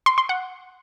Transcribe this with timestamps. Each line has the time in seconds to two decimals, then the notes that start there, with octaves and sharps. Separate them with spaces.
0.06 C6
0.18 C6
0.29 F#5